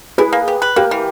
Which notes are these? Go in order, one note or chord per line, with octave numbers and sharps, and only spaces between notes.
E4 G#4 B4
A#3
G4
B4
A#3 G4 A#4
E3